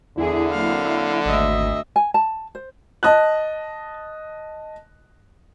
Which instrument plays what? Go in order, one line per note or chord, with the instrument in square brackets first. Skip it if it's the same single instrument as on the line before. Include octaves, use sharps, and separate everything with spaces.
[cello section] E2 G#4 [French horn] D3 [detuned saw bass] E4
[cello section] F#3 A#3 C4 [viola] F5
[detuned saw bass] G#1 [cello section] D2 [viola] D#5 E5
[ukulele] G#5
A5
C5
[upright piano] D#5 A5 F#6